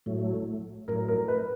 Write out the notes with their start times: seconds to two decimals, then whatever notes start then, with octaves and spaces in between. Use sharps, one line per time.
0.06 A2 F#3 A3
0.88 A2 F#3 A3 A#4
1.08 A#4
1.28 B4